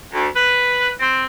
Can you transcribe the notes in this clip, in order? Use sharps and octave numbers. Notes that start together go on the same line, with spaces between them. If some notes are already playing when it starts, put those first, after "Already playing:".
D2
B4
C4